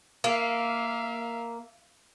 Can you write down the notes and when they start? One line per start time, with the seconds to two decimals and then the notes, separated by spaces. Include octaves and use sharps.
0.24 A#3 E5 F5